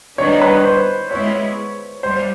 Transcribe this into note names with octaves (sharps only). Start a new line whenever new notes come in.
D#3 G3 B3 D4 C#5
B4
C5
G#3 B3 E4 C#5
G3 C5